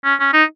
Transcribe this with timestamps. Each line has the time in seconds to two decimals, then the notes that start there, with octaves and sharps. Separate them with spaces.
0.04 C#4
0.20 C#4
0.33 D#4